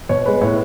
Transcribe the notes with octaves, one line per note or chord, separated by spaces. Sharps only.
B2 C#5
G#3 B3 B4
A2 C#5